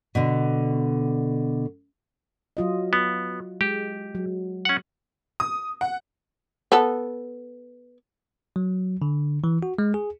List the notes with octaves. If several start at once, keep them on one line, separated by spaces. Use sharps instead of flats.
B2 D3
F#3 F4 D#5
B3
G#3 G4
F#3
C#4 F#5
D#6
F#5
B3 A4
F#3
D3
E3
F#4
G#3
G#4